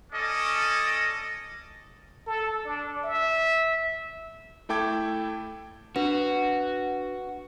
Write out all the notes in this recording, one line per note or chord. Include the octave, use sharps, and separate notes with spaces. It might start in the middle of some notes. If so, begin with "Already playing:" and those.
C#4 A4 D5 D#5
A4
D4
E5
A3 E4 A4 G5 D6 G#6
D4 F#4 B4